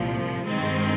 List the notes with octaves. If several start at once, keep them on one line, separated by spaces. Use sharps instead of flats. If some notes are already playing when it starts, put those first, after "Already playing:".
Already playing: C2 A#2 F3
G2 D#3 G#3 C4